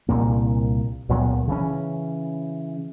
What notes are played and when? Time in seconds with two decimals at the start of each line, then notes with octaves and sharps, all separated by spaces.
0.09 C2 G2 A#2 A#3
1.09 C#2 A#2 F#3 B3
1.48 C#3 E3 C#4